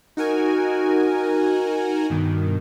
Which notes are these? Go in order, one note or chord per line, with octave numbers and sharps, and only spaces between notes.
D#4 F#4 A#4 G#5
G2 B2 D#3